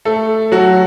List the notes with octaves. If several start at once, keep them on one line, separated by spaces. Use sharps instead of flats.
A3 A4
F#3 F#4